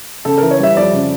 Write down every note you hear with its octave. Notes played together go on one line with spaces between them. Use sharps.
C#3 A4
E3 A#4
C#5
G3 E5
F2 D5
C#3